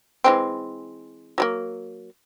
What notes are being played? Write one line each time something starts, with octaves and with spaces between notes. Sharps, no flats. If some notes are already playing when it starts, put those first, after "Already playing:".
E3 G#3 C4
F#3 G3 A#3